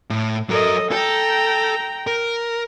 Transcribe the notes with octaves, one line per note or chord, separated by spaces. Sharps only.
A2
F#3 A4 A#4 D#5
A4 G5 A#5
A#4